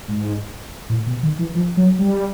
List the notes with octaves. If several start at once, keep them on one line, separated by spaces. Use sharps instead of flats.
G#2
A2
B2
D#3
E3
F3
F#3
G3